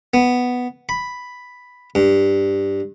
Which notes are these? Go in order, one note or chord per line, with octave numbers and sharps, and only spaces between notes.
B3
B5
G2